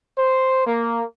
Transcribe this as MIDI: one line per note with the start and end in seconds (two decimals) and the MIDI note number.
0.17 0.62 72
0.67 1.03 58